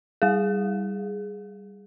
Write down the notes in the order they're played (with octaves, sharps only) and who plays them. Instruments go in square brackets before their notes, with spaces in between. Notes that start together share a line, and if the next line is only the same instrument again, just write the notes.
[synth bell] G3 G#4